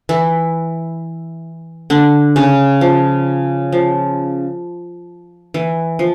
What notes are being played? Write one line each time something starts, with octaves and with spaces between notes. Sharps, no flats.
E3 E4
D3 D4
C#3 C#4
F3
F3
E3
F3